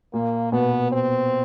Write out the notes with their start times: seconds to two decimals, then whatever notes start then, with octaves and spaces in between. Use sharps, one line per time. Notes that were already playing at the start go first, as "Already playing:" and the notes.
0.14 A#2 A#3
0.52 B2 B3
0.92 C4